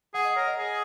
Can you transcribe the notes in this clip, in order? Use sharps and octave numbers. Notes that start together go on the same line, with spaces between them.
G#4 F#5
D#5
A#4 C#5
D#5
G#4